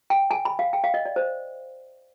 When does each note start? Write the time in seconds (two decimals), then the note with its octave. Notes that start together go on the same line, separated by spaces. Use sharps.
0.10 G5
0.31 G#5
0.45 B5
0.59 F5
0.73 G5
0.84 F5
0.94 D#5
1.05 D5
1.16 C5